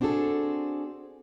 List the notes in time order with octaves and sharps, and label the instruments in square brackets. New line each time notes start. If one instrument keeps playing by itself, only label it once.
[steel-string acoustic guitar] C4 D4 F#4 G#4 A4